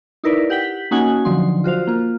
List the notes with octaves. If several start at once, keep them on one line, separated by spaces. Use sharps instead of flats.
D#4 E4 A#4 B4 D5
G4 F#5 G5 B6
A#3 C#4 D#4 F#4 F#5 G#5
D3 F3 F#3 D#4 C6
F4 F#4 C5 F5
A#3 F4